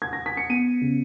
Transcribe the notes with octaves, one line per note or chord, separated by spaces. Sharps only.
G#6
A#6
B6
C#7
B3 D#7
C#3